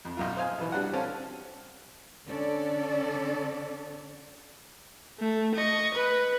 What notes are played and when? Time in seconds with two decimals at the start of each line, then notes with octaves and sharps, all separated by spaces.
0.05 F2
0.17 B1 F#2 F4
0.37 C5 D#5 F5 G#5
0.58 B2 E3
0.72 G3 D4 F#4 F#5
0.93 C4 C#4 A4 F5 A5
2.26 D3 C#4 A4 D5
5.19 A3
5.55 D#5 C#6
5.94 B4